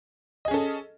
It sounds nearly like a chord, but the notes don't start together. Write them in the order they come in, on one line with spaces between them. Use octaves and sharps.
D#5 G#4 C#4 A4